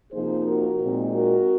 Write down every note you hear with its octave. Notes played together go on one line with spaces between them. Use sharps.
C3 F3 A#3 D#4 G#4 C5
F#4 A#4
A#2 G#3 C4 D#4
F#4 A#4